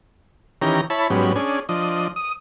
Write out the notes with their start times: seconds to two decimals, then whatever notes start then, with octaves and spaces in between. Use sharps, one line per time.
0.62 D#3 E3 C#4 G4 A#5
0.90 E4 C#5 A5 B5
1.10 G#2 F#3 G3 B3 C#4
1.36 C#4 D4 G#4
1.69 F3 D4 D#5
2.16 D#6